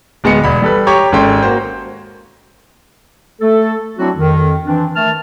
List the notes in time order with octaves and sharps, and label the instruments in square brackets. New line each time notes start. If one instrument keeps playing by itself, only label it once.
[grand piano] D1 G#3 B3 C#7
E1 B5
G3 A4 B4
G4 C#5 A#5 C#6
G#1 G#3 C#4 A4 G5 C6
A#3 F#4 C5
[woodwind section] A3 A4
F#3 C4 D4 E4 F#4
F2 D#3
E3 C4 D4
D#3 A3 A5 F6